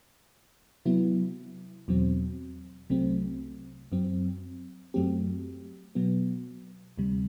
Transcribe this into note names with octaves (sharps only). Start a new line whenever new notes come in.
C3 F#3 B3 E4
E2 B2 F#3 C4
C2 C3 F#3 A3 C4
F#2 F#3 C4
F#2 F#3 A3 C4 G4
B2 F#3 B3
D2 C3 G3